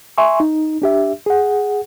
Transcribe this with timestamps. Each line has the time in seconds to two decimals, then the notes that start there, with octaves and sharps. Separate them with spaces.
0.18 E5 G#5 C6 C#6
0.40 D#4
0.82 D4 G4 E5
1.26 G#4 F#5